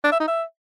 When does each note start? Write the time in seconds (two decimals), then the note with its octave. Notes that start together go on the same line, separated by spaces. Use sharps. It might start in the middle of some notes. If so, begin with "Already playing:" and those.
0.04 D4
0.12 E5
0.20 D#4
0.28 E5